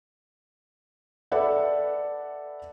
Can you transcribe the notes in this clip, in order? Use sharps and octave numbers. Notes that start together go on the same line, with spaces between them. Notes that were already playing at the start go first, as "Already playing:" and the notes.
A4 B4 D5 E5 F#5 B5